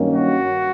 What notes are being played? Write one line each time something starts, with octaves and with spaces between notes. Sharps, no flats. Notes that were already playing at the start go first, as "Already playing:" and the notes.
Already playing: G2 D#3 F#3 A#3 C#4
F#4